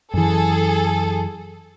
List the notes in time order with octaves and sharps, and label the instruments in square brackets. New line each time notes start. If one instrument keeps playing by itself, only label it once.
[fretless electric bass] F#2 E3 [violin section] G#4 A4